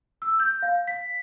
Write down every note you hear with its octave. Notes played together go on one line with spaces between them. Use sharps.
E6
G6
F5
B6